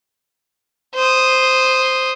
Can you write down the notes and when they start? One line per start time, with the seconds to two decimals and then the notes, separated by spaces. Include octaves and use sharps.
0.95 C5 D#6